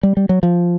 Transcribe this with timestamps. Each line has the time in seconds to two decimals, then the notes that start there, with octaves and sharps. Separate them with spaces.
0.03 G3
0.17 G3
0.29 F#3
0.43 F3